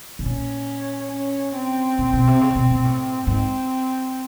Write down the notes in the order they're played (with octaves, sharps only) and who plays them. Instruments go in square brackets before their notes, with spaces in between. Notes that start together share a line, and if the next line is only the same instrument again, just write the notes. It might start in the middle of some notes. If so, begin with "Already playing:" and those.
[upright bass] B2
[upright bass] A#2 [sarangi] C#4
[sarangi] C#4
C4
[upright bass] A#2
B2
C3
C#3
C3
B2
B2
A2
[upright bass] G#2 [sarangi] C4